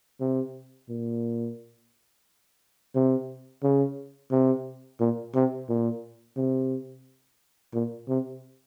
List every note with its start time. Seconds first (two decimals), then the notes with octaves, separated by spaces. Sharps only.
0.20 C3
0.89 A#2
2.95 C3
3.63 C#3
4.31 C3
5.00 A#2
5.35 C3
5.69 A#2
6.37 C3
7.74 A#2
8.08 C3